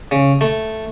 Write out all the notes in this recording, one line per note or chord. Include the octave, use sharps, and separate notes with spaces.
C#3
A3